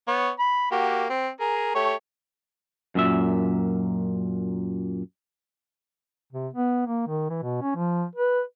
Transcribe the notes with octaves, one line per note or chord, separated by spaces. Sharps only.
B3 C#5
B5
A#3 F#4 G4
C4
G#4 A#4
A3 G4 C#5
F#2 A#2 E5
C3
B3
A#3
D#3
E3
B2
C#4
F3
B4